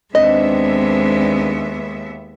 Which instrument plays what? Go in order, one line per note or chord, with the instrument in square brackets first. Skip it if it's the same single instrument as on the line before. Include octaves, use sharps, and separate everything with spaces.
[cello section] D#2 B3 E5 [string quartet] G#3 [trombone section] C4 D4 [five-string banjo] D#5